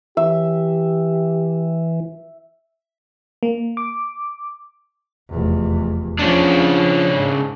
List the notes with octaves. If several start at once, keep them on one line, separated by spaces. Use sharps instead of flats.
E3 G4 E5
A#3
D6
F1 E2
C#3 F3 D4
G#2